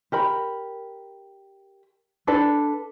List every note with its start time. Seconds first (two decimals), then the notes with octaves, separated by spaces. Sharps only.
0.12 G4 A#4 B5
2.27 D4 A4 B4